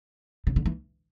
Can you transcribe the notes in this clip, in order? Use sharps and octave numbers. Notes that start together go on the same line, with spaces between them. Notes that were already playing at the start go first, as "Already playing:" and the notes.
C#3
D3
E3